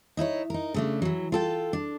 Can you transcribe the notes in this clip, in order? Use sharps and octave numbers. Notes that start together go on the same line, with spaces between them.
D#4 E4 A#4 C#5
D#4 A#4
C#3 A3 D4
E3 F#3
F4 A4 G5
D4